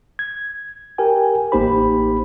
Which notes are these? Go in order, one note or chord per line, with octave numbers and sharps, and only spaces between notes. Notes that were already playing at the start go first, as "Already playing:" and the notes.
G#6
G4 A#4 G5 G#5
A1 A#3 D#4 G4 C5 B5